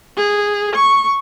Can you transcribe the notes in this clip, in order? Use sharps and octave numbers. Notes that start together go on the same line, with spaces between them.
G#4
C#6